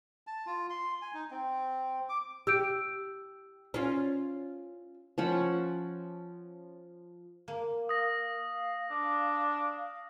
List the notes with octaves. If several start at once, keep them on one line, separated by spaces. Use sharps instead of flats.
A5
F4
C6
G#5
D#4
C4
D6
G4 E6 G6 D7
C#4 F4
F3 C#4 F#5 B5
A#3
F5 D#6 A#6
D4